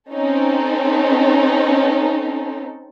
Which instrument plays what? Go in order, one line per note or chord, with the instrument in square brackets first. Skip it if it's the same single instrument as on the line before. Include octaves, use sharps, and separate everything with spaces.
[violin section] C4 C#4 D#4 A4